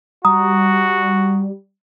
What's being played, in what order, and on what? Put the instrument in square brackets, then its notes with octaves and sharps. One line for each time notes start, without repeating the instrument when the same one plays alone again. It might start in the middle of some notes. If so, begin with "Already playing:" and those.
[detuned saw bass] G3 [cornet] F#4 [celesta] A#5 D#6